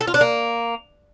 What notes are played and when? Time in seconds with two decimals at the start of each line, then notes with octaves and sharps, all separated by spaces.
0.01 A4
0.07 F4
0.14 D4
0.21 A#3